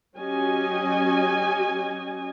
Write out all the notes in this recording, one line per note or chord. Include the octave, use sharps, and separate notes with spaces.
F#3 C#4 G4 D#5 G#5